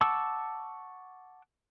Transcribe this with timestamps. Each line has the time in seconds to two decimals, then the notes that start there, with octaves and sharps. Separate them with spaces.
0.01 F#5 A5 C#6 D6 E6